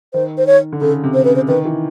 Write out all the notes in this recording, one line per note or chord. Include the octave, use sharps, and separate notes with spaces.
D#3 C5
C5
C#5
D3
C#3 A4
C3
C5
C#3 B4
C5
D#3 B4
E3